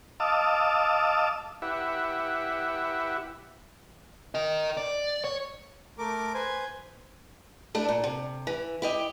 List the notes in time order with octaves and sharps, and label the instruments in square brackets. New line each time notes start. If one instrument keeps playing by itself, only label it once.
[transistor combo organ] D#5 F5 A5 D6 E6
E4 G4 B4 E5 F#5
[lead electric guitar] A#4 D#5
D5
C#5
[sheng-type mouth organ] A3 A#4 D6
B4 C5 G#5
[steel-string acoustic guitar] A3 D4 E4
A#2
C3
E3
E4 G4 D#5